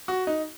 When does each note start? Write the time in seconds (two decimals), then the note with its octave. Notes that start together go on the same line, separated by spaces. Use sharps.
0.08 F#4
0.27 D#4